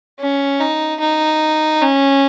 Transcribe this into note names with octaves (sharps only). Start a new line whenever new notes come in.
C#4
D#4
D#4
C#4